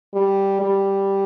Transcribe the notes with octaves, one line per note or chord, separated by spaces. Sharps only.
G3
G3